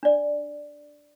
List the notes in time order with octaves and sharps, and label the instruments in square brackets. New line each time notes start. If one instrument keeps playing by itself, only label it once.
[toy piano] D4 D5